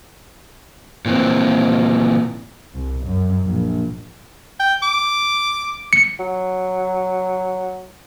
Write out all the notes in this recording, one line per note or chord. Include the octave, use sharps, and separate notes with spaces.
A#2 E3 C4
C2
F#2
A#1
G5
D6
C#7
F#3